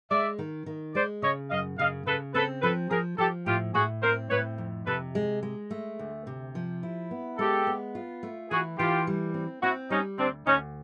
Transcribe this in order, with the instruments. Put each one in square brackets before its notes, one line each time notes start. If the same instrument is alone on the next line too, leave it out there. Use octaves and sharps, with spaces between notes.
[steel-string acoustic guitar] G#3 [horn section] D5 E5
[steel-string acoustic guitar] D#3
D#3
[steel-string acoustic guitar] G#3 [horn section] C5 D5
[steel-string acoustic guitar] C#3 [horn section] C#5 D#5
[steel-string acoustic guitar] F#2 [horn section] D#5 F5
[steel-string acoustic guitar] C#3 [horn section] D#5 F5
[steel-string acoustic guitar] C#3 [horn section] A4 B4
[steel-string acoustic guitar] C4 [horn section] A4 B4
[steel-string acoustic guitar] F3 [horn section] A4 B4
[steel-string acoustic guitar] F3 [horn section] G#4 A#4
[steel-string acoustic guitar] F3 [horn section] G4 A4
[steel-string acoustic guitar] A2 [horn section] F4 G4
[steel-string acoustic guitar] A2 [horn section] F#4 G#4
[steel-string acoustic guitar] C4 [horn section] A#4 C5
[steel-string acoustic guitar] A2 [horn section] B4 C#5
[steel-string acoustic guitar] F2
[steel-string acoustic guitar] C3 [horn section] A4 B4
[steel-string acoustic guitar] G#3
G#3
A3
D2
C3
F3
E4
B3
[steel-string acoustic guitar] G#3 [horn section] G4 A4
[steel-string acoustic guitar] B3
F4
A3
[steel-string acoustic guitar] E3 [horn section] F#4 G#4
[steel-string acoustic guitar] E3 [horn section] F4 G4
[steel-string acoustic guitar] G3
C4
[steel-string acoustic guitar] C4 [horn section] E4 F#4
[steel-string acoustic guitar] G3 [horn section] C#4 D#4
[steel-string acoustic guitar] D2 [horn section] C4 D4
[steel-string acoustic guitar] D2 [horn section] C#4 D#4